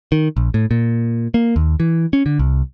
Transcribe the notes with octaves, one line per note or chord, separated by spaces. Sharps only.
D#3
A#1
A2
A#2
A#3
D#2
E3
C#4
D3
C2